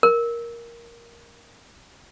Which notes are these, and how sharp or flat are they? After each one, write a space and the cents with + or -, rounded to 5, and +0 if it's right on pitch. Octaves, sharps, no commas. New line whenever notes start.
A#4 +5